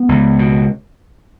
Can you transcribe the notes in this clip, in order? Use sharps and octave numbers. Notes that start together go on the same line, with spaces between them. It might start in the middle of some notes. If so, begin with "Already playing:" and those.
Already playing: B3
C#2
B2